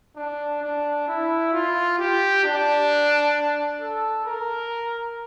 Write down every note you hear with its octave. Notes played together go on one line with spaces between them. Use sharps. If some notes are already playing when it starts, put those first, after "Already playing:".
D4
D4
E4
F4
G4
D4
A4
A#4